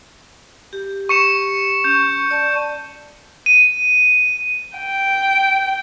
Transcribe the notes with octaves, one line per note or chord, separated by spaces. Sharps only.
G4
C#6 C#7 E7
C#4 G6
D5 A5
D#7
G5